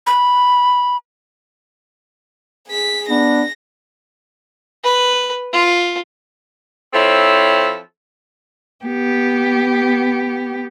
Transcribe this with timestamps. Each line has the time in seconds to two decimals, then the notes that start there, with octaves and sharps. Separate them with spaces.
0.07 B5
2.68 G#4 B6
3.09 B3 D4 A#6
4.84 B4
5.53 F4
6.94 F3 C4 E4 A4 C#5
8.85 B3 G4